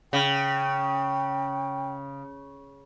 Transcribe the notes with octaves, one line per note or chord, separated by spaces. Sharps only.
C#3 G5